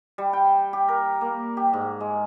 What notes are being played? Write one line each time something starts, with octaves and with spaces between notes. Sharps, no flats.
G3
G5
G4
A#4
A#3
G4
G#2
G#3